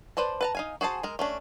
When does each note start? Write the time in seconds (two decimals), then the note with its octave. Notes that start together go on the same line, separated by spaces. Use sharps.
0.17 B4 C5 D5 A5
0.41 B4 A5 A#5
0.55 D#4 F5 G#5
0.81 F#4 G#4 C5 A5
1.03 G#3 A#4
1.19 A3 C#4 D4